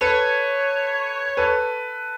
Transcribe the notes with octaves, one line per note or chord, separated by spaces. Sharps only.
A4 B4 C#5
A4 B4